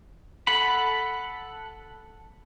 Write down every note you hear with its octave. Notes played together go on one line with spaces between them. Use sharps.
A4 F#5 B5